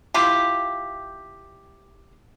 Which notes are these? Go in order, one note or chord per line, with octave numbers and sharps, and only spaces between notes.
E4 F4 G4